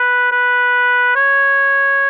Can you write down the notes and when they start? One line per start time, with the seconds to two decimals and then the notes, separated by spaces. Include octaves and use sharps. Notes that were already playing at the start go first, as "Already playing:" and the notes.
Already playing: B4
0.31 B4
1.16 C#5